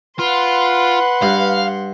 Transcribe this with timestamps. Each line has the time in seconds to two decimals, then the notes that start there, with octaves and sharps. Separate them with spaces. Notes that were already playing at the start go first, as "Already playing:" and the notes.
0.19 F4 B4 F#5 C6
1.22 G2 F5